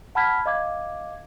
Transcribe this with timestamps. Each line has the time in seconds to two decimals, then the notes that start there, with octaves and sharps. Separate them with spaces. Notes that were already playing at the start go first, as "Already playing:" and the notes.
0.15 F#5 A5 B5 F6 G#6 B6
0.46 D#5 F5 D6 G#6